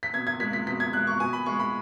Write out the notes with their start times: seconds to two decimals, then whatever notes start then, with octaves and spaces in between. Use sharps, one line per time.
0.03 B6
0.13 B2 G#6
0.27 G#6
0.40 G#3 B6
0.53 B6
0.67 B2 B6
0.80 G#6
0.93 G#3 F#6
1.07 C#6
1.20 B2 G#5
1.33 B5
1.46 G#3 C#6
1.60 B5